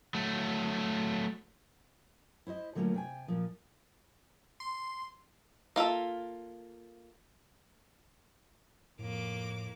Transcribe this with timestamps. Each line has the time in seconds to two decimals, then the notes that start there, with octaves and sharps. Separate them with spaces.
0.14 F#3 A3
2.47 E4 C5 C#5 D#5
2.75 D3 F#3 A3 A#3 C#4 F4
2.94 C3 G5 G#5
3.28 A#2 F3
4.60 C6
5.76 A#3 F4 A4 E5
8.99 F2 A2 A#3 D6